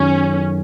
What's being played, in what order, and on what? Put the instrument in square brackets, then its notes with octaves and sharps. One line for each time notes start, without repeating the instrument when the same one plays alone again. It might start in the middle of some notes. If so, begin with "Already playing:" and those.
Already playing: [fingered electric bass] F#2 D#3 F#3 [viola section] C#4